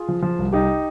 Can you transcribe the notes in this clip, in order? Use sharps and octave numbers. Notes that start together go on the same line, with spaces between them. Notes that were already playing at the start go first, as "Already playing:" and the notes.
Already playing: F4 G#4
F3
F3
C2
C2 D#4 G4